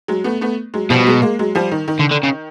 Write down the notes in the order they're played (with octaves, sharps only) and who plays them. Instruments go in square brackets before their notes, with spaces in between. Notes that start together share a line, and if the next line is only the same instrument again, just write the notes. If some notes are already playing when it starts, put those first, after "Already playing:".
[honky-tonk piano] F#3 G#3
A3 B3
A3 B3
F#3 G#3
[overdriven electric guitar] B2 [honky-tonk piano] F3 G3
[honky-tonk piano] F#3 G#3
G#3 A#3
F#3 G#3
F3 G3
D#3
D#3
[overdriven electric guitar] D3
D3
C#3